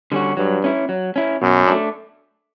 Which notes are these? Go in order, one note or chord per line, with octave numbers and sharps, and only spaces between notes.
D3 G3 C#4 F#4
G2 F#3
C#4 E4
F#3
C#4 E4
F#2 B2
A3 D4